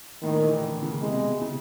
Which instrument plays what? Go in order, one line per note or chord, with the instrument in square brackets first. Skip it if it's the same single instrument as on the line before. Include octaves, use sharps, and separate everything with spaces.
[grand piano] A2 [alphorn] D#3
[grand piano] A#2
E3
D#3
D3
C#3
[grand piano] C3 [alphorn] G#3
[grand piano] B2
C3
C#3